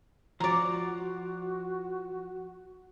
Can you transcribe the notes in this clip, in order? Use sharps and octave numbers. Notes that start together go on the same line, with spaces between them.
F3 F#4 D5 A#5